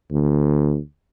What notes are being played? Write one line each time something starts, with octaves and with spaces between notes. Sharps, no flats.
D2